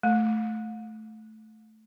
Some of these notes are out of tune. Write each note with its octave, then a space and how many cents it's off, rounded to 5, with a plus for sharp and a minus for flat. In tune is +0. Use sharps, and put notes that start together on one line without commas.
A3 -10